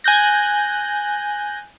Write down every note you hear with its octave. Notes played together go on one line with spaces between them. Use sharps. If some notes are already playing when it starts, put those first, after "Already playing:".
G#5 F#6 G6 A#6